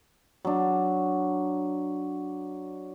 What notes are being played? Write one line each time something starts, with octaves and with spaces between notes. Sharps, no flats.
F#3 D4